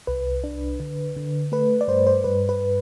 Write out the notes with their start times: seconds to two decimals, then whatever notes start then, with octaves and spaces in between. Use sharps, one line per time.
0.07 C2 B4
0.44 D4
0.80 D3
1.17 D3
1.52 A3 B4
1.81 D5
1.88 G2 C5
2.07 C5
2.24 G2 B4
2.49 B4